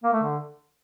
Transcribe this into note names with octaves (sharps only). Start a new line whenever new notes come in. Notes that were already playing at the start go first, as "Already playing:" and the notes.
A#3
A3
D3